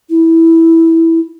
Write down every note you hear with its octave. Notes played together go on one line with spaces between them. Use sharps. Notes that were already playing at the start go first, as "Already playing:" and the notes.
E4